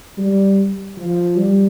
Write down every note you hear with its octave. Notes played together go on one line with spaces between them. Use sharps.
G3
F3
G3